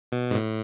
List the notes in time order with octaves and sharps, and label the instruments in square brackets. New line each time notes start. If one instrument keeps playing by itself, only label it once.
[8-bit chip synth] B2
G#2
A2